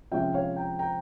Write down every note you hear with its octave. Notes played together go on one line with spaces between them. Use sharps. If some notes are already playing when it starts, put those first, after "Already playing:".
C3 F3 G#3 C#4 E5 G5
C#5 F5
G5 A#5
G5 A#5